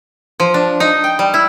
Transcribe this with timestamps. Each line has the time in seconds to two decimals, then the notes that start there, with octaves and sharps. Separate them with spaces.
0.40 F3
0.54 D4
0.80 D#4
1.04 G5
1.19 G3
1.34 E4